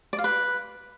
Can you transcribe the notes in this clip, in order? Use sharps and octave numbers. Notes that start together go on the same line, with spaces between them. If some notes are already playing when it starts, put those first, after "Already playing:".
D5
F5
B4